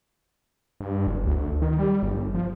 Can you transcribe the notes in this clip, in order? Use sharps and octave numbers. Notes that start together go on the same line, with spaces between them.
G2
F#1
D2
D#3
G3
G1
F3